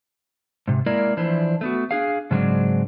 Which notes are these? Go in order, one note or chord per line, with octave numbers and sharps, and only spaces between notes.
G#2 C3
G#3 A#3 E4 A#4 D5
E3 F3 D4 E4 C5
A3 B3 F#4
D4 G#4 F5
G#2 C#3 F#3 G#3 C4 D4